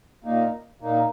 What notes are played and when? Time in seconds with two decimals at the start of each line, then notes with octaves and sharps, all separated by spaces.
0.24 A#2 A#3 D#4
0.80 A#2 A#3 D#4